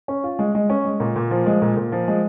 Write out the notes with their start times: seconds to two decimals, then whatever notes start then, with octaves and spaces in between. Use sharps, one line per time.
0.08 C#4
0.24 F4
0.39 G#3
0.55 G#3
0.70 C#4
0.85 G#3
1.00 A#2
1.16 A#2
1.31 F3
1.46 G#3
1.62 A#2
1.77 A#2
1.92 F3
2.08 G#3